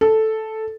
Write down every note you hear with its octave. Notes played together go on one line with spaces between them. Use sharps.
A4